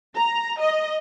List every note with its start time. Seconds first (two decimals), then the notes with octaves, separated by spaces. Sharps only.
0.15 A#5
0.60 D#5